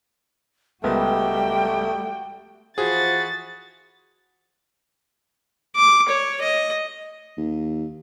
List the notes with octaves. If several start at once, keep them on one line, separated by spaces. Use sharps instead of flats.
C#2 G3 A3 B3 F#4 A#4 G5
E3 F3 F#4 G#4 A6
D6
C#5
D#5
D#2